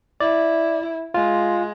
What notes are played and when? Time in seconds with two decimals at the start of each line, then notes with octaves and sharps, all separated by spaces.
0.20 E4 D5
1.14 G#3 F4